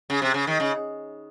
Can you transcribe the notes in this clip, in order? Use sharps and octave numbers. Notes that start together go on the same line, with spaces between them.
C#3
C3
C#3
D#3
C#3